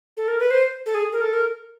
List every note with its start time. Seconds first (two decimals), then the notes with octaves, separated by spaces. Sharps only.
0.17 A4
0.28 A#4
0.39 B4
0.51 C5
0.86 A4
0.95 G#4
1.12 A#4
1.21 A4
1.33 A#4